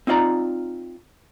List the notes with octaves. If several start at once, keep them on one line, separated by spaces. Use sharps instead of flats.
C4 D#4 F4 D5 A#5